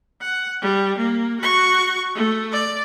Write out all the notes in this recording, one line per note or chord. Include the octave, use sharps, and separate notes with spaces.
F#5
G3
A#3
F#4 C#6
A3
D5